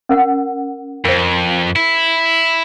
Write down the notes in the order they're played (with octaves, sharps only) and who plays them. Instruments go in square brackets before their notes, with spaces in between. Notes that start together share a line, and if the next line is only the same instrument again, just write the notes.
[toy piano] C#4 A#4 F#5
[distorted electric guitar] F2 [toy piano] A#4 C5
[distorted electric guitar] E4